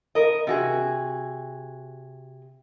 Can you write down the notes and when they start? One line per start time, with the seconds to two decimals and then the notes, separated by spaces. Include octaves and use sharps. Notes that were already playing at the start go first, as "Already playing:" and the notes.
0.15 A#4 D#5
0.47 C3 F#4 G#4